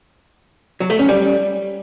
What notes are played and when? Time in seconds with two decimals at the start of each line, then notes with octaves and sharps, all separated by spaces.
0.80 F#3
0.90 A3
0.99 C#4
1.09 G3